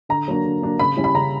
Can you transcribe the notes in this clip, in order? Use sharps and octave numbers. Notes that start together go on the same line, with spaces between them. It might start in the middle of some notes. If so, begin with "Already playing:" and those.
D3 A#5
F#3 A#3 D4
D3
F#3 A#3 D4
C#3 B5
G3 C#4 E4
B5
C#3 A#5